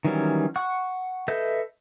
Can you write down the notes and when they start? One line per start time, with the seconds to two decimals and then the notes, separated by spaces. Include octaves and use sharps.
0.05 D#3 E3 F#3 G3 C#4
0.56 F#5 C#6 F#6
1.28 A4 B4 D#5 E5 G6